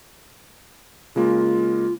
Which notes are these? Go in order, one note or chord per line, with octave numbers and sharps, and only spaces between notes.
C#3 G#3 A#3 F4